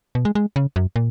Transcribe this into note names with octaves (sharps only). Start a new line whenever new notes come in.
B2
G#3
G#3
C#3
F#2
A#2